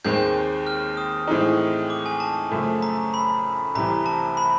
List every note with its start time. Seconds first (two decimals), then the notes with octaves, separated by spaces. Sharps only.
0.04 D#2 D#3 G#3 C4 G6
0.67 F6
0.97 D#6
1.28 A2 E3 G#3 C4 D#4
1.90 D6
2.06 G#5
2.20 A5
2.51 F#2 C#3 F3 A3
2.82 A#5
3.14 B5
3.75 C2 C3 E3 A#5
4.06 A5
4.37 B5